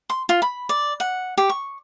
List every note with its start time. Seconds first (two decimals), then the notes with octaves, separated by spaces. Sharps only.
0.10 C6
0.29 F4
0.42 B5
0.69 D5
1.00 F#5
1.37 G4
1.49 C#6